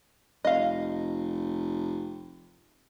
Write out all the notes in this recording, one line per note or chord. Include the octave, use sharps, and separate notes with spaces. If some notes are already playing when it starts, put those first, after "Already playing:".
F1 D#5 F5